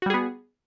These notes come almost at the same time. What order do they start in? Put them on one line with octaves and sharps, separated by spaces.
F#4 G3 G#4 B3